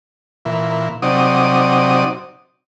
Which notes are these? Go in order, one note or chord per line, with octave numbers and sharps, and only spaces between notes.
A#2 E3
C3 F#3 D#4 D5 D#6